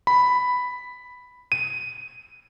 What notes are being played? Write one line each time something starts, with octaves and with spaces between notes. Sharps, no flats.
B5
D#7